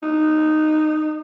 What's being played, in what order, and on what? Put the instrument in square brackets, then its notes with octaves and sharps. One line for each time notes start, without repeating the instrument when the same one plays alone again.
[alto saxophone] D#4